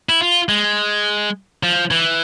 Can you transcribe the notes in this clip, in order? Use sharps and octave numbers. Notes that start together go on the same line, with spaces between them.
E4
F4
G#3
F3
E3